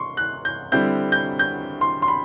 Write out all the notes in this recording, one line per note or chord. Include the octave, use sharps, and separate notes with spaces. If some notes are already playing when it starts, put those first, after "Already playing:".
Already playing: C6 C#6
F#6
G6
D3 G3 C4 E4 G6
G6
G6
C6
C6
B5